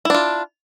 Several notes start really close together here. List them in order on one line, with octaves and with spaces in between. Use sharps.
E4 D4 F4